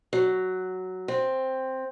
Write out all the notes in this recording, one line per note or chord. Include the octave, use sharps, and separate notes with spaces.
F#3
C4